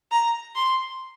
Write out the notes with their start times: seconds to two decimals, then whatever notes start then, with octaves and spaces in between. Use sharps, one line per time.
0.11 A#5
0.55 C6